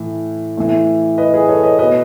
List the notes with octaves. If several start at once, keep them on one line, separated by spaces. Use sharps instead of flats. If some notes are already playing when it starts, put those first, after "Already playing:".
Already playing: A2 E3
A2 E3
B4 D#5
G#4 B4
A4 C#5
B4 D#5
B2 B4 D#5